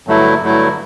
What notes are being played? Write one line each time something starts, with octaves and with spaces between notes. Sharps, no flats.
G2 D3 F#3 A3 E4
G2 D3 F#3 A3 E4